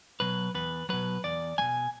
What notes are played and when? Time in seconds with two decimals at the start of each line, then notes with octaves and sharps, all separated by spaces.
0.20 B2 F#3 B4
0.55 E2 B4
0.89 B2 F#3 B4
1.24 E2 D5
1.58 F#3 G#5
1.62 B2